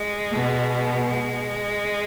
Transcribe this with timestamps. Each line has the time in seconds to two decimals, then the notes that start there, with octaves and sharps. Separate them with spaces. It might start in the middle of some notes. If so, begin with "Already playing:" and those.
Already playing: G#3
0.32 B2
1.06 G#3